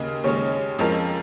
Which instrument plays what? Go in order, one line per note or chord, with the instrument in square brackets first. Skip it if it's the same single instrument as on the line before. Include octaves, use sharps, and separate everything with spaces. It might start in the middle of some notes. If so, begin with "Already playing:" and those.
Already playing: [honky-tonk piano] D#2 C#3 A#3 [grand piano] D#5
[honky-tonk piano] D#2 C#3 G#3 C#4 [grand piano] C#5
[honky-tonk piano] F2 F3 G#3 C#4 A#4